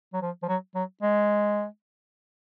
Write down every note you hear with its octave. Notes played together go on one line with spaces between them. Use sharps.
F#3
F3
F3
F#3
F#3
G#3